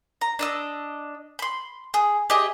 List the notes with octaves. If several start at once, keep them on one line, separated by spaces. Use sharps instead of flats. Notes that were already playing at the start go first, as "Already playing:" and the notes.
A#5
D4 D#5 E6
B5 C6
G#4
G4 G#4 D#5 E5